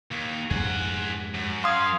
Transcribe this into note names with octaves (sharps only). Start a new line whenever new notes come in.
D#2
F2 G#2 G#3 G#4 F#5
F#2
F5 C6 D#6 G#6